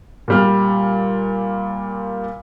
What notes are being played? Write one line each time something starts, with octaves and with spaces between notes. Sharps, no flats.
A#2 G3 F6